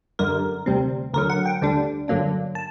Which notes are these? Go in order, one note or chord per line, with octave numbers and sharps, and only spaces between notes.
F#2 D3 G3 A#4
D2 C3 G3 C4
D2 D3 F#3 A#4
F#5
G5
D2 D3 G3 D4
G2 D3 F#3 A#3 D4
A5